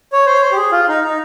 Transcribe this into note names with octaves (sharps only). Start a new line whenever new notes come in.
C#5
C5
C#5
C5
G4
G#4
F4
D#4
D#4